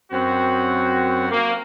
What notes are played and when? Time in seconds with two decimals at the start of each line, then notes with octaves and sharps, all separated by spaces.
0.12 F#2 C4 F#4
1.32 A#3